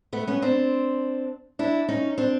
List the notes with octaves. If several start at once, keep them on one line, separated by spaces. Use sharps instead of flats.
A3 B3
B3 C#4
C4 D4
D4 E4
C#4 D#4
C4 D4